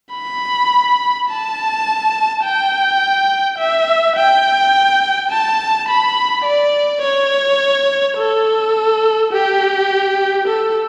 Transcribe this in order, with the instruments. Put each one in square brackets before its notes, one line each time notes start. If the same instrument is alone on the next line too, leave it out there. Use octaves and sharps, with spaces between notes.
[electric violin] B5
A5
G5
E5
G5
A5
B5
D5
C#5
A4
G4
A4